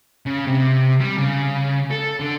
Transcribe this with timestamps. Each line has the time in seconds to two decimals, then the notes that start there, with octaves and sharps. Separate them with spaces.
0.26 C#3
0.47 C3
1.00 G3
1.17 C#3
1.91 A4
2.20 D3